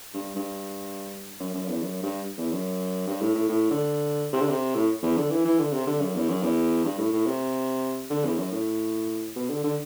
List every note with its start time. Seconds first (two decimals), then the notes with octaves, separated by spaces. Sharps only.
0.14 G2
0.35 G2
1.39 F#2
1.54 F#2
1.68 E2
1.82 F#2
2.02 G2
2.37 E2
2.52 F#2
3.07 G2
3.21 A2
3.35 A2
3.49 A2
3.70 D3
4.32 C3
4.41 D3
4.49 C3
4.75 A2
5.02 E2
5.17 D3
5.31 E3
5.45 E3
5.58 D3
5.72 C3
5.87 D3
6.01 F#2
6.15 E2
6.28 F#2
6.42 E2
6.84 G2
6.98 A2
7.12 A2
7.26 C3
8.10 D3
8.24 E2
8.38 F#2
8.51 A2
9.36 B2
9.49 D3
9.63 D3